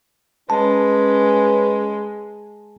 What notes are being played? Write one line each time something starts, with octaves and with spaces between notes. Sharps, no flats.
G#3 C#4 B4 A5